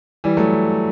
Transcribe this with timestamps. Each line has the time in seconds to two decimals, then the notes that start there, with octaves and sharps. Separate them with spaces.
0.24 E3 G3
0.37 F#3 A3